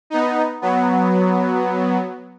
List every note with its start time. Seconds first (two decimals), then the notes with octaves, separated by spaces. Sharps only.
0.10 B3 D#4
0.62 F#3 B3